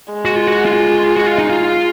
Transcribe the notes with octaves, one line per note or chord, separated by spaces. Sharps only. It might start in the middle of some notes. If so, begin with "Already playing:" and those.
G#3
F#4
F4
F#4
F4
F#4
F4
D#4
F4